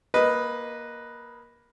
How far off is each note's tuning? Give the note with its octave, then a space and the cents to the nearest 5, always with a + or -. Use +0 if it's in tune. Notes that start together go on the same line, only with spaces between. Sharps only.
A#3 +20 B4 +0 D#5 +0